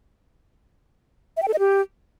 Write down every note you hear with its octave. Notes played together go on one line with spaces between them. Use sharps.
E5
G5
A4
D#5
G4